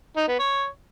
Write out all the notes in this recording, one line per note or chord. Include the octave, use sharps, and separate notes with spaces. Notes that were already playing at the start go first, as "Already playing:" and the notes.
D#4
B3
C#5